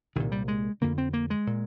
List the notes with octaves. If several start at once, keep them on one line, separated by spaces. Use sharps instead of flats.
C2 A#2 D#3
G3
G#3
F2 D3 A#3
C4
A#3
G#3
A#2